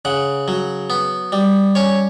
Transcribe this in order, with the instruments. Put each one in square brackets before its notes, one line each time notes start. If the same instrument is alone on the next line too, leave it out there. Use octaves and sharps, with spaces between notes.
[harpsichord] C#3 F#5
F#3
B3
G3
C#4 C#5